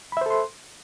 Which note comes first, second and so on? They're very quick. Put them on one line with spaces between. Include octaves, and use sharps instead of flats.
B5 E5 C5 A4 C6